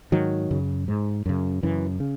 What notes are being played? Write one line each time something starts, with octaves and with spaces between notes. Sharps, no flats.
G#2 D#3 F#3
F#2 C#3
G#2
F#2 C#3
F#2 C#3 E3
C#3